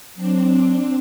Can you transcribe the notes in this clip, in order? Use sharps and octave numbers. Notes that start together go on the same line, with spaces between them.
F#3 C4 D4